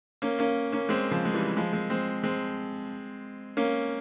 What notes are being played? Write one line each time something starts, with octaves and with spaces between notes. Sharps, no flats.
A#3 C#4
A#3 C#4
A#3 C#4
G#3 C4
C#3 F3
G#3
E3 G3
F3 G#3
G#3 C4
G#3 C4
G#3 C4
A#3 C#4